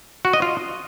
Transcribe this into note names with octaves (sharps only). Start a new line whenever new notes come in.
F#4
D#5
F4